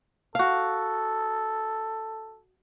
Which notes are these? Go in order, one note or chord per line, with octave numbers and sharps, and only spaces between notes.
F#4 A4 F5